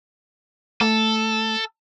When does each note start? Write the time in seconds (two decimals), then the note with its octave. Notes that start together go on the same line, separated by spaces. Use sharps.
0.81 A3 A4